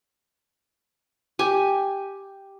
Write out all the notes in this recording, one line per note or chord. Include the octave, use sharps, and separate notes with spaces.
G4 G#5